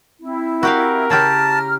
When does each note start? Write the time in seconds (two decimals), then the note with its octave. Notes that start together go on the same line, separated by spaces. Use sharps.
0.22 C4 E4
0.63 F#4 G4 A#4 F5
1.10 C#3 E4 G4 A5 A#5 F6